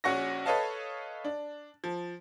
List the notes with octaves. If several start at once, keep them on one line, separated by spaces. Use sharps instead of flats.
A#1 C#4 F#4 F#5 C#6 A#6
A4 B4 C#5 D#5 F5 A5
D4
F3